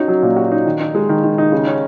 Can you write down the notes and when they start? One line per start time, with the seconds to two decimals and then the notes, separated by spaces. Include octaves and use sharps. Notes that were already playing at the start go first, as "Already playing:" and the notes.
Already playing: C#4 D#4 F#4
0.08 F#3
0.22 A#2
0.36 F#4
0.52 D#4
0.66 D#3
0.81 D#4
0.95 G#3
1.09 D#3
1.24 D#3
1.38 D#4
1.52 C#3
1.67 C#4